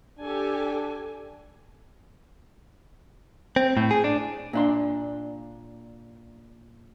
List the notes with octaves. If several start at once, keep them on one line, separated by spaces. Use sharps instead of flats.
D4 G4 A4 G#5
C4
A2
G#4
D4
A#2 D4 C6